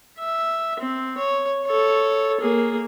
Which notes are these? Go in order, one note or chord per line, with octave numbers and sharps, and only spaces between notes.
E5
C4
C#5
A4 C#5
A#3 G#4